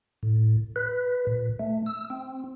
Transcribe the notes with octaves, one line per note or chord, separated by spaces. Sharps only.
A2
B4
A#2
A3
E6
C4